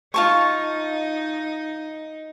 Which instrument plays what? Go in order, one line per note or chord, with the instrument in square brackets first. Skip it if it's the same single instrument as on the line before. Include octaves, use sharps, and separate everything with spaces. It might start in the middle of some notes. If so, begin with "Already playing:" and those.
[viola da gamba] D#4 [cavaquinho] F4 A5 C#6